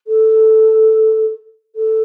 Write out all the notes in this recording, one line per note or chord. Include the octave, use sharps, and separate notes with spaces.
A4
A4